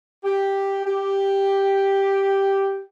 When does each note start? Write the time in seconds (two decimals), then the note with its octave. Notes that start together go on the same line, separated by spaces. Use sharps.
0.24 G4
0.85 G4